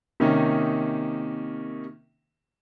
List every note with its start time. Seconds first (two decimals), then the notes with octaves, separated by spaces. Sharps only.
0.20 C3 D#3 A#3 C#4 D#4